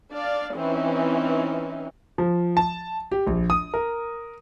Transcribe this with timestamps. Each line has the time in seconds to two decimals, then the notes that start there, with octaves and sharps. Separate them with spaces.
0.12 D4 D5 F5
0.54 E3 C4 C#4 D#4
2.18 F3
2.57 A5
3.12 G4
3.27 A#1
3.50 D#6
3.74 A#4